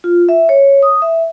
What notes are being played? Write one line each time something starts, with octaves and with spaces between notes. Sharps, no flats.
F4
E5
C#5
D#6
E5